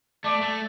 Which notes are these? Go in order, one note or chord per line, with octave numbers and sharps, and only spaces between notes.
A3 D5
A3